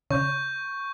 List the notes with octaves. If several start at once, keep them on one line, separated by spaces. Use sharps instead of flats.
C#3 C#6 G6